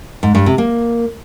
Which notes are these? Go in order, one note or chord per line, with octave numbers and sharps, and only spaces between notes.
G#2
G2
C3
A#3